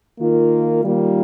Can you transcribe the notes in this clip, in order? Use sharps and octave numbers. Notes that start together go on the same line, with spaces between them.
D#3 A#3 F4
D#3 G3 A#3 F4